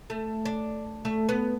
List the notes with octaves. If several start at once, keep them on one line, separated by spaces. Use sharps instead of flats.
A3
D4
A3
B3